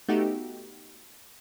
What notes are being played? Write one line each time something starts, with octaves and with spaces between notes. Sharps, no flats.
A3 B3 D#4 F#4 G4